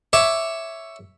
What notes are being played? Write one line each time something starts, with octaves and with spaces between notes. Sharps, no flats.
C#5 E5 D6